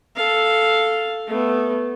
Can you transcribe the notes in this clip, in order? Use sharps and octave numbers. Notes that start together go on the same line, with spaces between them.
A4 F5
A3 B3